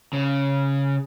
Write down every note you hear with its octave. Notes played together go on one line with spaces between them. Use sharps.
C#3